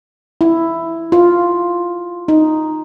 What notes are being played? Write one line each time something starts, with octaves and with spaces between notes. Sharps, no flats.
E4
F4
D#4